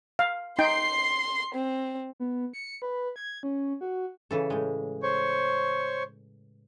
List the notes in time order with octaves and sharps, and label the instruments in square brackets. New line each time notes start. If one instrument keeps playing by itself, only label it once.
[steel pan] F5
[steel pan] D#4 G5 [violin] C6 C7
[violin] C4
[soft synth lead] B3
C#7
B4
G#6
C#4
F#4
[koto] C#3 E3 A4
A2 G#3
[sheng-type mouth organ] C5 C#5 C#6